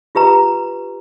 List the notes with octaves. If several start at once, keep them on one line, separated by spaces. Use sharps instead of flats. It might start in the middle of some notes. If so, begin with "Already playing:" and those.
F4 G4 B4 A#5